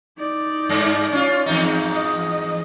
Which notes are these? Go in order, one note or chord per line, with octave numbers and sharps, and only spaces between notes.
D#4 D5
G2
C#4 F4
E2 G#2 D#4
D#5